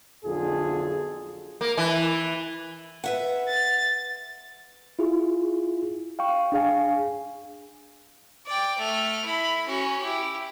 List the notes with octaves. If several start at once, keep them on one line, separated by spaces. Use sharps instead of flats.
B1 F2 D3 F4 G#4 A4
A#3
E3
B4 E5 F#5
A6
E4 F4 G#4
F5 G5 C#6
D4 G#4 F5 G#5
D5 G5
A3 F6
E4 B5
C#4 F#4
E4 G4